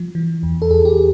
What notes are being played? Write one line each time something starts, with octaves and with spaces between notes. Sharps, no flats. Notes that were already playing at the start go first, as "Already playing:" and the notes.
Already playing: F3
E3
E2
A4
E2 G#4
G4